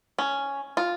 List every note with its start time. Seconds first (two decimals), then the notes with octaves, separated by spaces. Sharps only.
0.18 C#4
0.77 F4